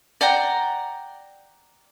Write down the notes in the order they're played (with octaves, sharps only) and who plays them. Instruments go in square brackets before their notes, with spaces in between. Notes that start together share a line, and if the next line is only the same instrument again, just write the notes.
[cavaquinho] D5 F#5 G5 A#5